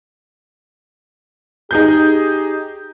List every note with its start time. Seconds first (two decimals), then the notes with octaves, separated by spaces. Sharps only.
1.71 D#4 G4 G#4 G6